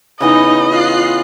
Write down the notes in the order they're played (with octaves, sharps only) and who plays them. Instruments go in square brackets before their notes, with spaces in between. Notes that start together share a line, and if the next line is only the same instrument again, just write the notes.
[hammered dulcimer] C#3 E3 B3 [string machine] D#4 [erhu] D#5
[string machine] F4 F#6 C7